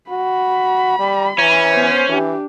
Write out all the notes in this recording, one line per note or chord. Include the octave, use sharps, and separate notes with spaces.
F#4 B5
G3
E3 C#4
B3 C5
E3 D4 G4